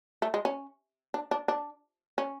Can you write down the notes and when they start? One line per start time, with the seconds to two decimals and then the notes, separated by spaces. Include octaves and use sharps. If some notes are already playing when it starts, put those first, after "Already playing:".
0.22 A3
0.34 G#3
0.45 C#4
1.14 D4
1.31 D4
1.48 D4
2.18 C#4